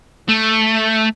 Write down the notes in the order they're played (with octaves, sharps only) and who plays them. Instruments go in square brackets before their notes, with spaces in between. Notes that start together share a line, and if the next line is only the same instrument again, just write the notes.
[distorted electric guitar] A3